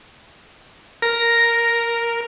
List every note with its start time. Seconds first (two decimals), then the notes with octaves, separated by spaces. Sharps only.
1.02 A#4 A#6